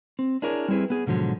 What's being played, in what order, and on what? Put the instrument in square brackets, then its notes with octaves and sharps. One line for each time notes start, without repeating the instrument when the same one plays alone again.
[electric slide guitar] C4
D4 E4 G#4 A#4 C#5 D5
G3 C4 E4 G#4 B4
B3 G#4
G#2 B2 D3 F3 F#3